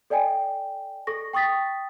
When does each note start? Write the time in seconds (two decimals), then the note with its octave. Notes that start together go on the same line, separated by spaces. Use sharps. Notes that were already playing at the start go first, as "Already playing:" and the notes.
0.10 A4 D5 D#5 G5 G#5
1.07 A4 C#6 A#6
1.33 G5 C#6 D#6 A6 B6